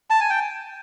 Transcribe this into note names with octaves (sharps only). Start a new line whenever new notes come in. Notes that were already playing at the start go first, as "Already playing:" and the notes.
A5
G#5
G5